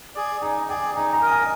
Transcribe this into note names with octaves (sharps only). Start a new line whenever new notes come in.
G#4 D5
D#4 G#5
G#4 D5 G5
D#4 G#5
A#5
A#4 D#5
G#5